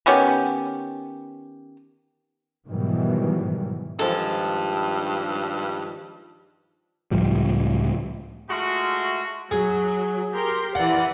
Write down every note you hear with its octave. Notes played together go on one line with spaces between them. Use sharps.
D#3 B3 C#4 G4
G#2 B2 D#3 E3 F#3 G3
G2 D#3 F3 G#3 A4
C#2 A2 F3 G3
G#3 A3 F4 F#4
F#3 G#4
G4 A#4 C6
E3 D5 F#5